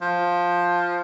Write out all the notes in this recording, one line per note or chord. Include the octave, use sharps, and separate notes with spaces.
F3